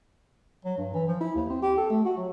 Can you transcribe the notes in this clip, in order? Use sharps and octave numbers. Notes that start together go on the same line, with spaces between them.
F#3
G2
E3
F3
E4
D#2
C4
G4
A4
A3
F#4
F#3